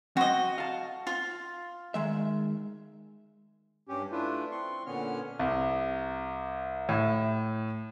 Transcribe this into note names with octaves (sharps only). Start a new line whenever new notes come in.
C4 F#4 D#5
F5 A5
F4
D#3 G#3 E5
G2 C#4 G4
A3 D4 E4 F4 B4
C4 C6 C#6
A#2 D3 B3 C#4 C#5 F6
C2
A2